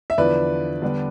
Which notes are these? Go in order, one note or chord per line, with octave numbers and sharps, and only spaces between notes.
E5
E2 D3 F3 B4 D5
D3 G3 B3 D4